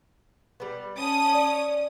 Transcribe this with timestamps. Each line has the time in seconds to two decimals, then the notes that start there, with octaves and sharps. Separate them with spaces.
0.60 G3 B3
0.99 C#4 A5 D#6
1.34 D5